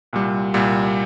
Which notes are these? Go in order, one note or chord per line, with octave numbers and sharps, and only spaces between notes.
C2 A#2 G3
C2 A#2 G3